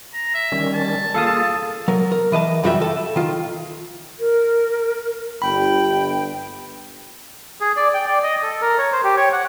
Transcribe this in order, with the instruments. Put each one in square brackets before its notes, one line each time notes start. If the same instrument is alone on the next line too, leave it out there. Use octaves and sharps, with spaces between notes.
[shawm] A#5
E5
[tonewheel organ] D#3 G3 C#4
[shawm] A5
[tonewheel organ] A#3 F4 G#4 [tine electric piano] A4 F5 D#6
[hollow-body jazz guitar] F#3 A#4
A#4
E3 D#5 F#5 A5
F#2 G3 F4 F#4 E5 G5
A4
D#3 F4
[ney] A#4
[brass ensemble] G1 [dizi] G5 [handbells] B5
[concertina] G#4
D5
G5
D5
D#5
A4
A#4
C#5
C5
G4
C#5
F#5